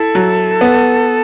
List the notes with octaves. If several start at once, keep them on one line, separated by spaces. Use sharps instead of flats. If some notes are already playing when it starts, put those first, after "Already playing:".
Already playing: E4 A4
F#3
B3